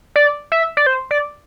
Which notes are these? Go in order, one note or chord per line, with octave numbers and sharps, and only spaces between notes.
D5
E5
D5
C5
D5